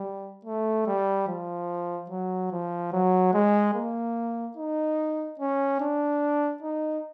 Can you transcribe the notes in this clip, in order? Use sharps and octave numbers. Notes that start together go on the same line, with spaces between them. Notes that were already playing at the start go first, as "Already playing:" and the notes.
Already playing: G3
A3
G3
F3
F#3
F3
F#3
G#3
A#3
D#4
C#4
D4
D#4